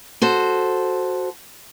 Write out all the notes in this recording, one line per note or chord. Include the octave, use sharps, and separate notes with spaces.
F#4 A4 C5